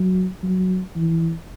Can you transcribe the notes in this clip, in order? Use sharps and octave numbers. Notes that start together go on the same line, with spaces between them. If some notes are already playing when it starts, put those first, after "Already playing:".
Already playing: F#3
F#3
E3